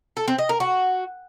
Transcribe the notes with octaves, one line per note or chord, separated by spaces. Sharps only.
A4
C4
D#5
A#4
F#4